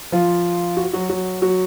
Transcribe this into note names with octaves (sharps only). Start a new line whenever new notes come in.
F3 F4
F#4
F#3 F#4
F#3 F#4
F#3 F#4